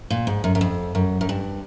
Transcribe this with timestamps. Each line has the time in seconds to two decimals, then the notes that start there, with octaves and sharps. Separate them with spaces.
0.10 A#2
0.27 G#2
0.44 F#2
0.55 F#2
0.61 F2
0.95 F#2
1.21 F#2
1.29 G2